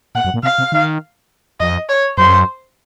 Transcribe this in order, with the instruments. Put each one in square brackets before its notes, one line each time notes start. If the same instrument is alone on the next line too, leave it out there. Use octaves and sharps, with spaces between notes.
[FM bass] A#2 [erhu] F#5
[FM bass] F#2
A#2
[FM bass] C3 [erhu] F5
[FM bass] C3
D#3
[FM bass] F2 [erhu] D#5
[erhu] C#5
[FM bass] F#2 [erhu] C5